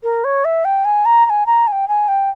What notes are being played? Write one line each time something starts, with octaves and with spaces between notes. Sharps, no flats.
A#4
C#5
E5
G5
G#5
A#5
A#5
G#5
A#5
G#5
G5
G#5
G5